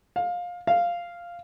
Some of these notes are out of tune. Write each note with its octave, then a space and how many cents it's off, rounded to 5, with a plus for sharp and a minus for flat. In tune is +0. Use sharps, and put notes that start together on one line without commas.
F5 +20
F5 -5